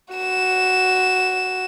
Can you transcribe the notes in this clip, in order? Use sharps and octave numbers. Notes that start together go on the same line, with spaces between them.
F#4 E7